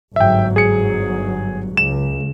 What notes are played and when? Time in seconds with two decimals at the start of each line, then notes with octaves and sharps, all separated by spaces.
0.16 G1 G#2 F#3 E5 G5
0.56 G#4 C#7
1.77 C#2 E7